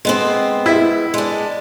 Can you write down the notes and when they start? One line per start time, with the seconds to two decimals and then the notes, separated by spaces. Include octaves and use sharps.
0.05 G#3 B3 C4
0.66 E4
1.14 G#3 D4